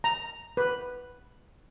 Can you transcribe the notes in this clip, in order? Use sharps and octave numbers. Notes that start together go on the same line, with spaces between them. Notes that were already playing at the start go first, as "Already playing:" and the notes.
A#5
B4